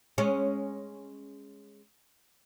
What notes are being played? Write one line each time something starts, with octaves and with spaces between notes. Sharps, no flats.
G#3 C#4